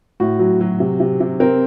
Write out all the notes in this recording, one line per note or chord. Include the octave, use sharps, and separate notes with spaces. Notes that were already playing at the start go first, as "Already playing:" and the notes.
A2 F#4
F#3
F#3
C3
C3
C3
C4 A#4